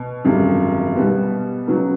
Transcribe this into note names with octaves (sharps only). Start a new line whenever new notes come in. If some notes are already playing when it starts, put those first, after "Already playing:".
Already playing: B2
G#1 F#2 D3 G3
B2 G3 B3
C#3 F#3 B3 D#4